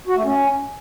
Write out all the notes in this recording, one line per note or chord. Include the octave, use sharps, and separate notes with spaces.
F#4
A3
C#4